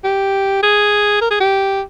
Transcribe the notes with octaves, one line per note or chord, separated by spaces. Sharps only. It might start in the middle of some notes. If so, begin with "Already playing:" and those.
G4
G#4
A#4
G#4
G4